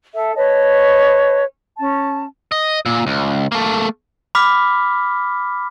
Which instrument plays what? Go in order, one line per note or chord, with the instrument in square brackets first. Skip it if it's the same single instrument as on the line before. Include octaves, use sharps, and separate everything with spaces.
[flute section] A4 E5
B4 C#5 D#5 A5
C#4 A5
[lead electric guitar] D#5
A#2
C#2
A3 A#3
[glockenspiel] B5 D6 F6 B6